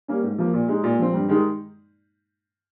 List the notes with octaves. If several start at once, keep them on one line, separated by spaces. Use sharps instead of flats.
G3 A#3 C#4
G#2
F3 A#3
A#2
G#3 D#4
A#2
F3 C4
G2
D#3 G#3 D#4